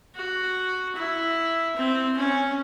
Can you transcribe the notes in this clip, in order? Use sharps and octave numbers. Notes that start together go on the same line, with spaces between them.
F#4
E4
C4
C#4